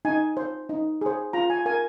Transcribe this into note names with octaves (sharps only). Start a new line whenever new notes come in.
D#4 G#5
C5
D#4
G#4 C5
F4 A#5
G#5
A#4 G#5